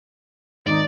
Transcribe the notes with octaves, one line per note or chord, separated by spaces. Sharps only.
G#1 D#4 D5